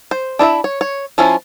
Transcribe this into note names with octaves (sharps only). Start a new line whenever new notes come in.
C5
D4 E4 D#5 E5
C#5
C#5
F3 C#4 E4 F4